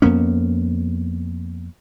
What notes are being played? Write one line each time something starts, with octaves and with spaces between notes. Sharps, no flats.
F2 A#3 B3 C#4